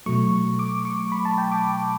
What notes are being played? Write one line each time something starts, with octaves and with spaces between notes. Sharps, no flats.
B2 F#3 A3 C#6
D6
C#6
B5
A5
G5
D6